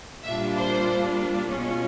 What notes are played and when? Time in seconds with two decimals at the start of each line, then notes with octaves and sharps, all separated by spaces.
0.25 A#2 G3 A#3 D4 F4 E5
0.56 C5
1.50 B2 G#3 C#4 F4